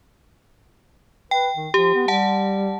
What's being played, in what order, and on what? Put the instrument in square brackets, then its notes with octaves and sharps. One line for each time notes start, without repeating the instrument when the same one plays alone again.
[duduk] B4 [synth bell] G5
[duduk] D#3
[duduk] F3 [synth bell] G4
[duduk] B3
[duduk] G3 [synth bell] F#5 A5